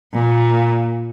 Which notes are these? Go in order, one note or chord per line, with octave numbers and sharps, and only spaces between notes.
A#2